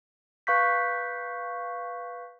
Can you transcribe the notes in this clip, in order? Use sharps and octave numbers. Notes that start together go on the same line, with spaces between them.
B4 F5 C#6 G6 B6